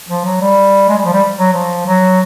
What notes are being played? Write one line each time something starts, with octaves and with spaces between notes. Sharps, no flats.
F3
F#3
G3
G#3
G3
F3
G3
F#3
F3
F#3